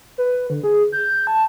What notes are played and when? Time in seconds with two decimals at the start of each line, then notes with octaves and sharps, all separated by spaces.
0.18 B4
0.50 D3
0.63 G#4
0.92 G6
1.27 A5